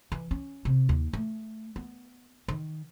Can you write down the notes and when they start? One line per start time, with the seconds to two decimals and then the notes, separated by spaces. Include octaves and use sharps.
0.12 E3
0.31 C#4
0.65 C3
0.89 D#2
1.13 A3
1.76 B3
2.48 D#3